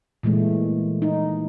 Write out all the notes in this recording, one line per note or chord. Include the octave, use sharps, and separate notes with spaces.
A#2 E3 G#3 A3
D#4